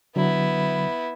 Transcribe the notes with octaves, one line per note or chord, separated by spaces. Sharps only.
D3 F#3 B3 E4